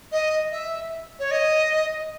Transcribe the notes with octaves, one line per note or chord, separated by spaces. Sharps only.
D#5
E5
C#5
D#5